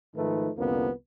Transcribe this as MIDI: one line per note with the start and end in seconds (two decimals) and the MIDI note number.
0.16 0.49 44
0.16 0.49 51
0.16 0.49 53
0.16 0.49 57
0.16 0.49 63
0.16 0.49 71
0.57 0.89 36
0.57 0.89 41
0.57 0.89 50
0.57 0.89 53
0.57 0.89 58
0.57 0.89 59